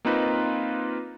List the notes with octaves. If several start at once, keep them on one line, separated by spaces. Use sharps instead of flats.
A#3 C4 D#4 F4 B4